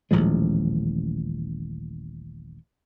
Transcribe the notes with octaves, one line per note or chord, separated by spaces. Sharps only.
D#1 A1 F3 G#3